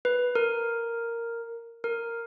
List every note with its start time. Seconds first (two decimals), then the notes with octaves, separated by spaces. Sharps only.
0.05 B4
0.35 A#4
1.84 A#4